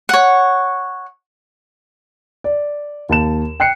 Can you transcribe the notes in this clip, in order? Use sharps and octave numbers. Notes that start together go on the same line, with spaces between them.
C#5 F#5
D5
D#2 A5 E7
G5 F#6 C7 C#7